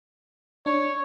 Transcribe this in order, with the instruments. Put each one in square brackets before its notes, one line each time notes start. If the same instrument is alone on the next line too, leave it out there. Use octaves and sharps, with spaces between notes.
[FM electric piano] D4 [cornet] C#5